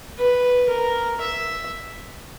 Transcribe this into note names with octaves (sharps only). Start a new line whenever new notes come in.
B4
A#4
E5